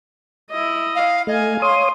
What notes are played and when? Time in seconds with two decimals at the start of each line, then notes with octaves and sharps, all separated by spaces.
0.50 E4 D#5
0.95 F5
1.27 A3 D#5 F5 G#5
1.62 C#5 F5 C6 D#6